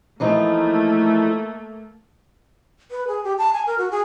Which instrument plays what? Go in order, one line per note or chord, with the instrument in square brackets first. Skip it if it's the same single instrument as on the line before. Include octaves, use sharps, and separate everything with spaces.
[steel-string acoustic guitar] E3 F3 D#4 [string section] A3 A#3
[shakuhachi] B4
G#4
G4
A5
G#5
A#4
F#4
G#4